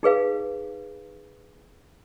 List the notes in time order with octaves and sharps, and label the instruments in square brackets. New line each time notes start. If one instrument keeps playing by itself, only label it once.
[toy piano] D#4 G#4 B4 F5